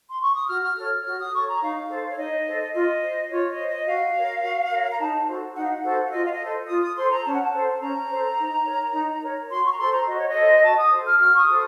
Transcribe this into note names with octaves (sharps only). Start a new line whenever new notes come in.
C6
C#6
D#6
F#4 F6
F6
A4 C#5 F6
F#4 F6
D#6
A4 C#5 C#6
A#5
D#4 F5
A4 C5
C#5
D#4 D#5
A4 C5
F4 D#5
C5
F4 C#5
D#5
C5
D#5
F#4 F5
A#4 C#5
F#4
A#4 C#5
A#5
D#4 A5
F#4 A4 C5
D#4 F#5
F5
F#5
F#4 A4 C5
F5
F4 D#5
F5
D#5
A4 C5
F4 D#6
D#6
A4 C5 C6
A#5
C#4 A5
F#5
A5
A4 C5
A5
C#4 A#5
A4 C5
D#4
A#4 C#5
D#4
A#4 C#5
F#4 C6
C#6
A#5
A4 C5 C6
A#5
F#4 D#5
C#5
D#5
A4 C5
F#4 A5
D#6
A4 C5
F6
F#4 F6
C#6
D#6
A4 C5